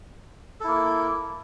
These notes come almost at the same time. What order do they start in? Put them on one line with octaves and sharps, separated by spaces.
A4 E4 A#3